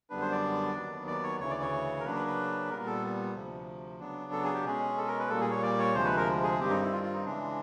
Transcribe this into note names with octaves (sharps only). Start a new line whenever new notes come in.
F#2 D3 G3 B3 D4 B4
C5
D5
D#2 D#3 F#3 B3
D5
C#5
D2 C#3 E3 C#5
D5
C#5
A#4
C#3 F#3 A#3 D4 B4
B4
B4
A#2 G3 B3 A#4
A4
D2 C3 F3
C#3 F#3 B3 D4
A4
G#4
G4
B2 G#3 C#4 G#4
A4
A#4
B4
A#2 G3 A#3 A4
G#4
C#5
D5
C#5
D2 C3 F3 G#3 C5
B4
A#4
G#4
G2 D#3 G3 C4 G4
D#4
E4
F4
F4
D#4
C#3 E3 G#3 D4